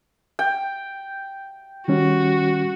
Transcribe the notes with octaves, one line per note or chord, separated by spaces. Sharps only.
G5
D#3 G3 C#4 F#4